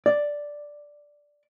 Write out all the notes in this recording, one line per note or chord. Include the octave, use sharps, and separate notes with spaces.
D5